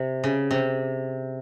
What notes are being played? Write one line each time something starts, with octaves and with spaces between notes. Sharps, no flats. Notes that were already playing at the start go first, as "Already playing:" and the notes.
Already playing: C3
C#3
C3